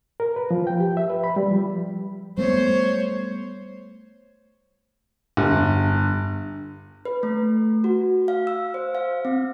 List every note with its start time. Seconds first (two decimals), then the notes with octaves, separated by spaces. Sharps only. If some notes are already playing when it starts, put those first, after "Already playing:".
0.20 A#4
0.36 B4
0.51 F3
0.67 G5
0.80 G4
0.97 E5
1.10 B4
1.24 B5
1.36 G3
1.51 F3
2.38 G3 A3 B3 C5 C#5
5.37 G1
7.05 B4
7.23 A3
7.84 F#4
8.28 F5
8.47 E6
8.74 C5
8.95 F5
9.25 C4